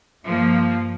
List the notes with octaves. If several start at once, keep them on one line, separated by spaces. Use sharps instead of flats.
G2 F3 A#3